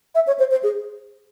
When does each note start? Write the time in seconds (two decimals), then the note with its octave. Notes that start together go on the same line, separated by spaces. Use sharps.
0.15 E5
0.27 C#5
0.39 C5
0.51 C5
0.63 G#4